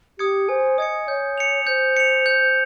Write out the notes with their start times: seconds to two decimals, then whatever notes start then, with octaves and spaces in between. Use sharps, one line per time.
0.19 G4 D#6 G#6 C#7
0.49 C5 G#5
0.78 D#5 D#6 G#6 C#7
1.08 C#5 G6
1.38 C#7 F7
1.67 C5 G6
1.97 C#7 F7
2.26 G6